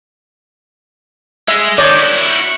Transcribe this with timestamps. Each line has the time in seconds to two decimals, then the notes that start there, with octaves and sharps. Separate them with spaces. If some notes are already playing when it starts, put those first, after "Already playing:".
1.48 G#3 E5
1.78 D#3 C#5 D5
1.96 E4 F#4